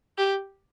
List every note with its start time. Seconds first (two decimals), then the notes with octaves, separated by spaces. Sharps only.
0.18 G4